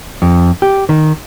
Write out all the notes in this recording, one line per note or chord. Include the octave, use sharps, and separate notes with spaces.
F2
G4
D#3